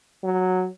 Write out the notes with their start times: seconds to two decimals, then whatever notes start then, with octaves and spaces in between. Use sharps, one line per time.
0.24 F#3